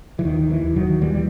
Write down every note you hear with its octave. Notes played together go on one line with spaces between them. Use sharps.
E3
D#2 D#3
E3
D#2
D#3 F#3
D#2 E3 G3
G3